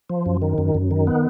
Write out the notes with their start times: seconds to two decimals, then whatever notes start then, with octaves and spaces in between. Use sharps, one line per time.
0.10 F3
0.26 F#2
0.42 D#3
0.58 F#2
0.75 F#2
0.91 D#3
1.07 B3